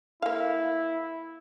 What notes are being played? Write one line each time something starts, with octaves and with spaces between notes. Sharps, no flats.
A#3 E4 F5